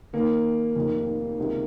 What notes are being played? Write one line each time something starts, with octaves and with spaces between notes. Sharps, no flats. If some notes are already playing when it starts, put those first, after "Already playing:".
D#2 D#3 A#3
F1 F2 D#3
C#2 C3 D#3